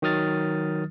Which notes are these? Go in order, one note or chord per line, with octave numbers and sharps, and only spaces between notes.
D#3 F#3 D#6 F6 A6